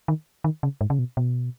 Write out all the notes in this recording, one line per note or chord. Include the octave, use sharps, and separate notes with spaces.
D#3
D#3
C#3
G#2
C#3
B2
B2